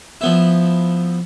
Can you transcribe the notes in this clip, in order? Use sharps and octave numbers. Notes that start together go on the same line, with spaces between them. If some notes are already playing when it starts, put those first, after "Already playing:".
F3 B3 E4